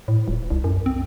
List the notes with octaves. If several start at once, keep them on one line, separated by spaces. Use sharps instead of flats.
A2
D#1
C2
F#2
C4